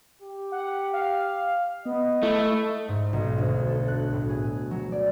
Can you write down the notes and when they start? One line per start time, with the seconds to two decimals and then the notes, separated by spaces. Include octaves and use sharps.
0.22 G4
0.52 F#5
0.93 F5
1.86 B3 D#5
2.23 A3 E4
2.88 G#2
3.13 B1
3.38 D2
3.68 A4
3.88 F#6
4.13 A2
4.30 G#4
4.71 F#3
4.92 D5